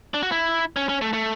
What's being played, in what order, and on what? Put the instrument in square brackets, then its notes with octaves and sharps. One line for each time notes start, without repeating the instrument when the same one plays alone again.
[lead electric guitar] D4
F#4
E4
C#4
C#4
A3
A3